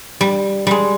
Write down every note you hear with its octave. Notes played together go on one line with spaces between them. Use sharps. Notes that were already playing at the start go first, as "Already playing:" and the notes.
G3
G3 G#3